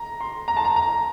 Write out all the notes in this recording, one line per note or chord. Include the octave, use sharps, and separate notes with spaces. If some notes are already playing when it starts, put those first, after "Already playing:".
Already playing: A#5
C6
A#5
A5
A#5
A#5